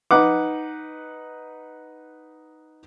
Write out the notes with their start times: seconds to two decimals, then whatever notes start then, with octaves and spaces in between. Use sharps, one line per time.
0.11 D#4 B4 F#5 D6